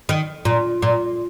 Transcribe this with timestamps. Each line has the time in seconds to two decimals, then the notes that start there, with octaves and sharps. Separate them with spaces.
0.09 D#3
0.45 A#2
0.82 A#2